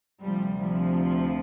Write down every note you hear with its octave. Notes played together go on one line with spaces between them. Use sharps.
D2 C3 F3 G3
F3